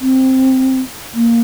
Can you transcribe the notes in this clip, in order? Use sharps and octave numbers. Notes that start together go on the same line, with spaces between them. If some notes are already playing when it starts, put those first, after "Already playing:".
C4
A#3